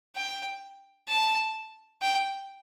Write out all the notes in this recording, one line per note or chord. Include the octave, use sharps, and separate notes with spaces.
G5
A5
G5